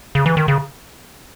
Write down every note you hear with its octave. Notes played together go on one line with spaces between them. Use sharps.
C#3
E3
D#3
C#3